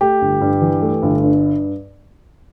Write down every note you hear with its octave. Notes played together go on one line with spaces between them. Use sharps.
A3 G4
G1
G2
E3
A3
G1
G2